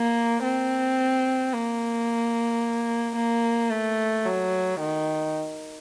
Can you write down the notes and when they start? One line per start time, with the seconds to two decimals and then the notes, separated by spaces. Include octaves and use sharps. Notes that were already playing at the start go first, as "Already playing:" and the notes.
Already playing: A#3
0.43 C4
1.53 A#3
3.16 A#3
3.71 A3
4.26 F#3
4.80 D#3